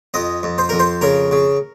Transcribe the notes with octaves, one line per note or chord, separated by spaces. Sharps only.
F2 D#5
F2
C5
F2 A#4
C5
C#3 A#4
C#3